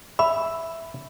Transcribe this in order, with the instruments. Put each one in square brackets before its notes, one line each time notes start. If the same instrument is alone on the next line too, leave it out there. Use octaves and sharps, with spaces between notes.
[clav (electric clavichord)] E5 [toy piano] B5